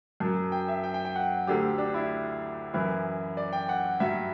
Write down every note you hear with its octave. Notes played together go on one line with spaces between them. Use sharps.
F#2 F#3 A5
G5
E5
G5
G5
G5
F#5
D2 D3 F#3 G4
D4
E4
F#2 E3 E4
D5
G5
F#5
G2 F#3 E5